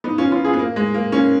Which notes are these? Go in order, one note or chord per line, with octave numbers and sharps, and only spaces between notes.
B3 D#4
C#4 F4
C#4 F4
F4 G#4
B3
A#3
G#3
A#3
A#3 C#4